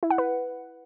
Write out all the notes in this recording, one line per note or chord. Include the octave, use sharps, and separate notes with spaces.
E4
F#5
B4